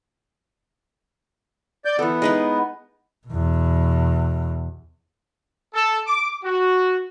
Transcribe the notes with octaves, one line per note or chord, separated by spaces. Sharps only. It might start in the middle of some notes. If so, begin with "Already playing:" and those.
D5 G6
E3 B3 A4
G#3 D#4 B4
E2 B2
A4
D6
F#4